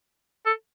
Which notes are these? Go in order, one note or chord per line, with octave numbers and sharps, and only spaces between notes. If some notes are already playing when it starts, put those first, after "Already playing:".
A4